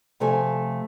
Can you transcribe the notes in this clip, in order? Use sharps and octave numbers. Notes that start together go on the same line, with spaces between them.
C3 F3 A3 G#5